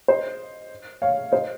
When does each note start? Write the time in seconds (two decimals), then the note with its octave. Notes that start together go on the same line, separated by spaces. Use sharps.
0.08 C5 D#5
1.02 C#5 F5
1.32 C5 D#5